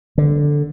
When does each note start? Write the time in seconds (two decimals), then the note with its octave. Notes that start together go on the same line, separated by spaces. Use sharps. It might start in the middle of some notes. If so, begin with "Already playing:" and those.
0.18 D3